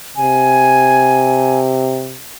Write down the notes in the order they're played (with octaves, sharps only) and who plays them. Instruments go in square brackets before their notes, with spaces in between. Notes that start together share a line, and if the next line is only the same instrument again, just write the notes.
[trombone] C3 [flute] G#5